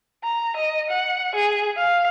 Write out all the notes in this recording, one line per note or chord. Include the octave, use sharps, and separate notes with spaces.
A#5
D#5
F#5
G#4
F5